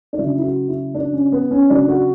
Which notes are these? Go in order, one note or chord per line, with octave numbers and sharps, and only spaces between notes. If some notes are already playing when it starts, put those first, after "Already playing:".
D4
C#3 F#3 E4
E4
F#4
E4
D4
C#4
B3
C#4
C#3 F#3 D4
F#4